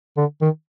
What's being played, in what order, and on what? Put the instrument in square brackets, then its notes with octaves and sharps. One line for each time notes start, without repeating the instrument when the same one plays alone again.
[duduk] D3
D#3